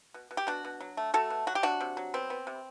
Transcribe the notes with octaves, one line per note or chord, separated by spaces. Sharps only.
B2
B2
G4
B2 D4 F#4
B2
F#3
A3
A3 F#4 A4
B2
F#3 F#4
G4
C3 D4 F#4
C3
F#3
B3 C4
B3
C3